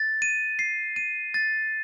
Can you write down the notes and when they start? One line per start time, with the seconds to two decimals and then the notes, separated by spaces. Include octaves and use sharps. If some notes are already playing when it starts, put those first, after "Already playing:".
Already playing: A6
0.22 D#7
0.59 C7
0.96 D#7
1.34 A6